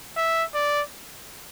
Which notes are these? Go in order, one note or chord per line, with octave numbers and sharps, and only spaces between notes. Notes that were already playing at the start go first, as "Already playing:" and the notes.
E5
D5